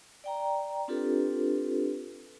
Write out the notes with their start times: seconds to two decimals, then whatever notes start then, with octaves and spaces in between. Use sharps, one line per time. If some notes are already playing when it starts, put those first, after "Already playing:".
0.24 D5 G5 A#5
0.88 C4 D4 F4 G4 A4 B4